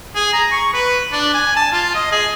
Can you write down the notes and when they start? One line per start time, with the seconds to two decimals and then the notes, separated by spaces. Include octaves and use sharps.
0.15 G#4
0.33 A#5
0.51 C#6
0.74 B4
1.12 D4
1.34 G#5
1.56 A5
1.73 F4
1.94 D#5
2.12 G#4